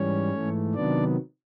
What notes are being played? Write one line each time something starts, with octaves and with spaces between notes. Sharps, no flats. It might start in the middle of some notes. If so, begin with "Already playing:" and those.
Already playing: G#2 E3 G3 C#4 C#5
G#2 E3 A3
C3 D#3 F#3 B3 D4 D5